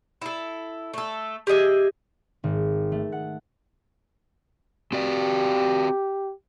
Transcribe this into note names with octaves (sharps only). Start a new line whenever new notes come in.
E4 A4
A3 A4
G4 G#4 D#5 E5
G#1
A3
F#5
C4 F#4 G4 D5